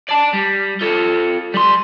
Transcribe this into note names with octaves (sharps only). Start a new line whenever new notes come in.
D5 A5
G3
F4 A4
G3 C6